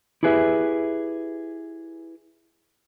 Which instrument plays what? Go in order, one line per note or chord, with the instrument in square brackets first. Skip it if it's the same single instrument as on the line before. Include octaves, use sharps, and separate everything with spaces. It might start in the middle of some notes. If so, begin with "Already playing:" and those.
[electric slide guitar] E4 G4 G#4 B4 E5